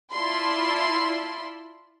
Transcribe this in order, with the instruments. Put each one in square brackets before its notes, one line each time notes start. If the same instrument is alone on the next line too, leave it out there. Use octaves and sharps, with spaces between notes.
[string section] E4 F4 D5 A5 B5 C6